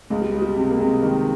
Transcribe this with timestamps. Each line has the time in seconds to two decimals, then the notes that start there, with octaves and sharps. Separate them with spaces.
0.10 C#2 G#3
0.22 G3
0.34 G#3
0.42 G3
0.56 C3
0.70 A#3
0.79 C3 G#3
1.02 D#3